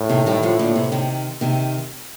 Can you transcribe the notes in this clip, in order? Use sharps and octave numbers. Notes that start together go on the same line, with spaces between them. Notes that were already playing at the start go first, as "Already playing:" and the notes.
Already playing: A2
C3 D#3
D#3 G3
D3 F3
A#2 D3
C3
C3 D#3
C3 D#3